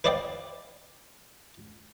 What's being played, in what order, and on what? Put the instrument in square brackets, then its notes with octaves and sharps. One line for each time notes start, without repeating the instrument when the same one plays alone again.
[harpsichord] B4 C5 D5 D#5 F5 G5